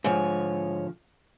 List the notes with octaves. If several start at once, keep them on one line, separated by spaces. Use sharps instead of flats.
G#2 D3 F3 F4 C#5